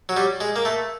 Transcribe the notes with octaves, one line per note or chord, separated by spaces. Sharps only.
F#3
G3
G#3
A#3
A3